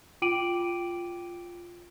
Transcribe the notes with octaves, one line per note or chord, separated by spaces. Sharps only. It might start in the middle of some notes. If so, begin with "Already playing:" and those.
F4 G5 D6 D7 D#7 F#7